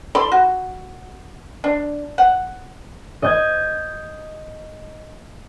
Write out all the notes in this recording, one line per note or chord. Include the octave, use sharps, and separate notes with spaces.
A4 D5 B5 C6
F#4
D4
F#5
D#5 G6 G#6